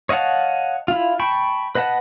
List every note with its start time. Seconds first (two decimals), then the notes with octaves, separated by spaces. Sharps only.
0.09 C#5 D#5 F5 F#5 A5
0.88 E4 F4
1.19 G5 A5 B5 C#6
1.75 B4 D#5 F#5 A5